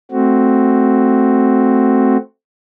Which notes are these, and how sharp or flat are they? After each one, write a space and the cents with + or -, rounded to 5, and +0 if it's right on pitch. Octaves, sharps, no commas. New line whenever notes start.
A3 +0 C4 +0 F#4 +5